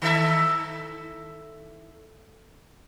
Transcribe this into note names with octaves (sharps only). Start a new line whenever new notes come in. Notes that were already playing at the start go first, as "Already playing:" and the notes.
D#3 A4 E5